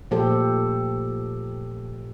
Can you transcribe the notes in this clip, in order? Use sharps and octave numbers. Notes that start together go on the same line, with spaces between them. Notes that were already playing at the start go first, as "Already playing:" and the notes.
A#2 F3 A3 G4 A4 C5